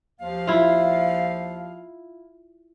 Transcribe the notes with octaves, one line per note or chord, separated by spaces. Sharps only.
D#2 F3 F5
E4 F4